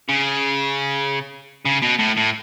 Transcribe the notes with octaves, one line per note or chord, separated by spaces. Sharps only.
C#3
C#3
B2
A2
A2